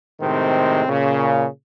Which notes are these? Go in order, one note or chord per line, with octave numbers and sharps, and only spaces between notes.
A2 C3 D#3 G#3 C4
A#2 C#3